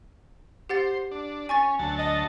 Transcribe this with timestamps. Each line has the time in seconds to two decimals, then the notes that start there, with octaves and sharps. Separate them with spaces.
0.69 G4 C5 F#5 A6
1.11 D4
1.49 C#4 G#5 C#6 A6
1.79 D2 F#3 A5
1.98 D#5